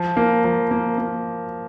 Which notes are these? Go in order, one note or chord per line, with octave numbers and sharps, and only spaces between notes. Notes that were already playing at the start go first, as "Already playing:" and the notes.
Already playing: F3
A#3
F3
A#3
A#3